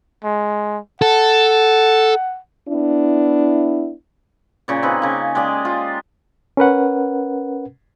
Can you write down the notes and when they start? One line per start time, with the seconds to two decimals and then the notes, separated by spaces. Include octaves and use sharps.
0.24 G#3
1.02 A4 F#5
2.69 B3 D4 E4
4.68 A#2 C#3 D5
4.83 C4 D#4 G#4 B4
5.02 C#3 A#3
5.35 G#3 G4 D5 D#5
5.65 F4
6.57 C#4 A#4 B4 F#5